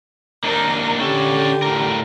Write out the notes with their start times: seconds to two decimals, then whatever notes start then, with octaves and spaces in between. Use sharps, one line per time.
0.43 A#3 D4 D#4 A#4
0.99 D3 C#4 G4 A4
1.62 A2 A#4